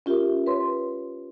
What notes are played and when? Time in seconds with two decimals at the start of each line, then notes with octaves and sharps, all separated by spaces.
0.06 C#4 F4 G4 A#4 E5
0.47 B4 C#5 C6